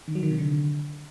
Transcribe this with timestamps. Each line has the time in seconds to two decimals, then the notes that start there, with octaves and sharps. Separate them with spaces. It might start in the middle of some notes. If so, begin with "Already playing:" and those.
0.08 D#3
0.15 F#3
0.23 D#3
0.31 C3
0.38 D3